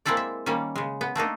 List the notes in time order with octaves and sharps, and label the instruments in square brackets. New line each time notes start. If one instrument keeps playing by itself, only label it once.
[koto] G#3 A#3 C4 E4 A4 D5
E5
D#3 G3 A#3 C#4
C#3 G#3
B3
A3 A#3 D4 D#4